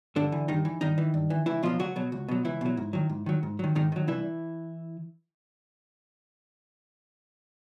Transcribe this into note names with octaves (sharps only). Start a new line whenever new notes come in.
G2 D3 D4
E3
G2 D#3 D#4
E3
G2 D#3 D#4
E3
G2
E3
C#2 E3 E4
B2 F3 F#3 F4
C#2 F#3 F#4
B2 F#3
C#2
B2 F#3
C#2 E3 E4
B2 F#3
G#2
D#3 F#3
G#2
D#3 F#3
G#2
D#3 F#3
G#2 D#3 D#4
D#3 F#3
C2 E3 E4